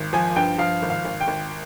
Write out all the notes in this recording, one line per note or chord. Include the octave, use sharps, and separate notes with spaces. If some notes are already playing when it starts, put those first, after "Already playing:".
Already playing: G#1
F3 G#5
G2 G5
F3 F5
G#1
F5
G#1
G5
G#1